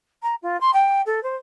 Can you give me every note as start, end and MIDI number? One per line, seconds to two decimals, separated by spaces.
0.23 0.35 82
0.42 0.59 65
0.61 0.71 84
0.73 1.02 79
1.06 1.22 69
1.23 1.36 72